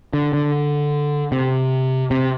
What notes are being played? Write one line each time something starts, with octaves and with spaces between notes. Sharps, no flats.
D3
D3
C3
C3